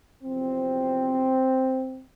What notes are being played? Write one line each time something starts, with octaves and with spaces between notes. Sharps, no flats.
E2 C3 F3 C4